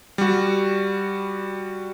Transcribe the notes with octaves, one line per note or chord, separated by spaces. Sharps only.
G3 F#4